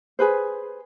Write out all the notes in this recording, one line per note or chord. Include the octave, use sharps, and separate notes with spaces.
G#4 B4 C5